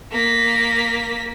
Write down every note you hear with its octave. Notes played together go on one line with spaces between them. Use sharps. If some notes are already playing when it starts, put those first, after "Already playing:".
A#3 B6